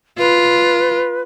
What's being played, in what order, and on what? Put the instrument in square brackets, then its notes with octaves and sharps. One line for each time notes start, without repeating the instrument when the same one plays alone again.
[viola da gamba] F4 [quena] B4